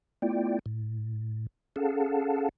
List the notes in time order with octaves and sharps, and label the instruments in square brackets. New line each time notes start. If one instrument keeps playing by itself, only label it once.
[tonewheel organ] A3 B3 E4 F4 D5 G5
A2
C#4 G#4 A4 F5 F#5 A5